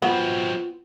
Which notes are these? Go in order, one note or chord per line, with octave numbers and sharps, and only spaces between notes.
F#3 B3 C4 F4